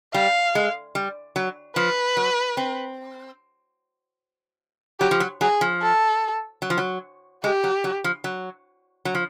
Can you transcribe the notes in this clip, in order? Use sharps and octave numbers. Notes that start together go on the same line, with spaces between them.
G3 F5
G#3
G3
F#3
F3 B4
F#3
C4
F#3 G4
F3
F#3
F#3 G#4
F3
A4
F#3
F3
F#3
G#3 G4
F#3
F#3
F3
F#3
F#3
F3